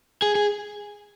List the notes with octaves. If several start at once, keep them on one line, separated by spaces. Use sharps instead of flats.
G#4
G#4